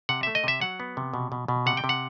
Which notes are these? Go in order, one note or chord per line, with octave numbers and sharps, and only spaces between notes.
C3 F#5
A3 E5
D#5
C3 E5
F#3 F#5
B3
C3
B2
B2
B2
C3 F#5
G5
C3
F#5